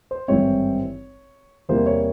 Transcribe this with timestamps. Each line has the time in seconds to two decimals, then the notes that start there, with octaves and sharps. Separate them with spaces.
0.11 C5
0.28 G#1 G2 E3 G3 C4 C#5
1.69 E2 C3 E3 G3 A#3 C5
1.86 C#5